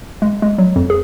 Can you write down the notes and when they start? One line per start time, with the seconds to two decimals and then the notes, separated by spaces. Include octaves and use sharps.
0.22 G#3
0.42 G#3
0.58 F#3
0.76 F2
0.90 G#4